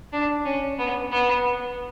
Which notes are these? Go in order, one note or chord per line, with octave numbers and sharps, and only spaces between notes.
D4
C#4
B3
B3